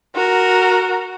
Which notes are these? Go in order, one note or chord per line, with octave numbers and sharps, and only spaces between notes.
F#4 A#4